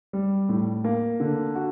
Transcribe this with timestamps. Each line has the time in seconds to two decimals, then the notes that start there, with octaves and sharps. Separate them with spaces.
0.13 G3
0.49 A2
0.84 A#3
1.20 D3
1.55 F#4